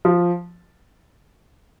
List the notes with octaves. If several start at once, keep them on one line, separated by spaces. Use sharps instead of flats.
F3